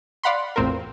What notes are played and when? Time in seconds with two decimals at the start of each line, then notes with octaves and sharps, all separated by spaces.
0.23 D5 F5 F#5 B5 C6
0.56 A1 E2 A2 C4 F4 A#4